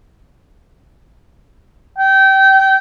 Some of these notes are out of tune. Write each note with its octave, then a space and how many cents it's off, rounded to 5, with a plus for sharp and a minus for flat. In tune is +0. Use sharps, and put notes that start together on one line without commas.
G5 -25